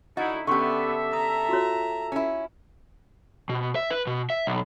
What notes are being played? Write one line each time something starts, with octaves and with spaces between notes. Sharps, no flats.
D3 D#4 E4 F#4 D#5
D3 B3 C#4 G4 A4 E5 C6 C#6
A#5 D#6
F4 F#4 C#5
C#4 E4
B2
E5
B4
B2
E5
B1